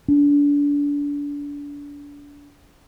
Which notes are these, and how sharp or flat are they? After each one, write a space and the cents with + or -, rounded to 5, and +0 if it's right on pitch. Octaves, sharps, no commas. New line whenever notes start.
D4 -30